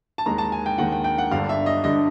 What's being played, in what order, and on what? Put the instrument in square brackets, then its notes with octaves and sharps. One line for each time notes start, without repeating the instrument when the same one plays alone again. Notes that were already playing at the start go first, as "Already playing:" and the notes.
[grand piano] A5
D#2 D#3 G#3 A#5
A5
G#5
G5
D#2 D#3 G#3 F#5
G5
G5
F#5
G1 G2 D3 F5
E5
D#5
G2 D3 D#5